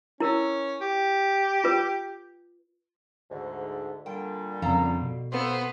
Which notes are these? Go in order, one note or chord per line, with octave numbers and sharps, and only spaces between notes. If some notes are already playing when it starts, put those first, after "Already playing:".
C#4 E4 A#4
G4
F4 B4
D2 G#2 D3
A#2 D3 G3 G5
F2 C#3 A4 F5 A#5
B2
G#2 B3 A4 C5 F5